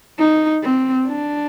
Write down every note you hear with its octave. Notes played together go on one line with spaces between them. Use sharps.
D#4
C4
D4